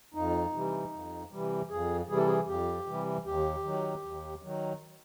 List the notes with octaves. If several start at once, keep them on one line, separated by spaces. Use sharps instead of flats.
F2 D#4
C3 E3 G3
F2
C3 E3 G3
F2 G#4
C3 E3 G3 G#4
A4
G#4
F2 G4
C3 E3 G3
D#2 G4
D#3 F#3
D#2
D#3 F#3